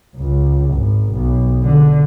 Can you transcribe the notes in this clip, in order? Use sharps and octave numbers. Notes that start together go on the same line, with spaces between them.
C#2
G#1
B1
D3